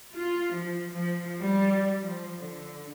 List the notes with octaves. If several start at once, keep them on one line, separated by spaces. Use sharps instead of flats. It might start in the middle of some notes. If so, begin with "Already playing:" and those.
F4
F3
F3
G3
F3
D3